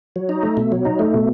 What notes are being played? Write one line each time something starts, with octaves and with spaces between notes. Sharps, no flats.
F#3
D#4
A3
B2
F#3
D#4
A3
B2